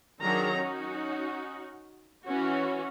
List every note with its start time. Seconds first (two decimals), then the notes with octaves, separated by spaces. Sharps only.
0.22 D#3 F#3 D4 G#4 A#4 A#5
0.57 C#4 D#4 F#4
2.26 E3 C#4 F#4